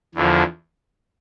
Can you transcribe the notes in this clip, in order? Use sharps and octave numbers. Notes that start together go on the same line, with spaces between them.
E2 D3 F3